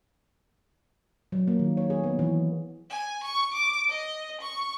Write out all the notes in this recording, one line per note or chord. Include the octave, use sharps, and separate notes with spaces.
F#3
A#3
D#3
C#5
G#4
B3
E3
G#5
C#6
D6
D#5
C#6